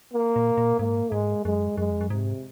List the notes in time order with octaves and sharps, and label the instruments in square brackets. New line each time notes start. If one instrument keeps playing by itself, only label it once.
[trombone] A#3
[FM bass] A#2
A#2
[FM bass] G#2 [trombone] A#3
[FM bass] G#2 [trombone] G#3
[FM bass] F#2 [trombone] G#3
[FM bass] F#2 [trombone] G#3
[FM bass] F2
F#2
[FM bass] G#2 [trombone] C3